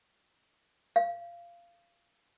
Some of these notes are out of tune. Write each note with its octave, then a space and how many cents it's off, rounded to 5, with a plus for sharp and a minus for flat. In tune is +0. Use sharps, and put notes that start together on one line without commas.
F5 -20